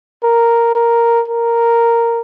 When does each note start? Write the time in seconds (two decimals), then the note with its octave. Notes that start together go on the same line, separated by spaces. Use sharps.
0.23 A#4
0.75 A#4
1.28 A#4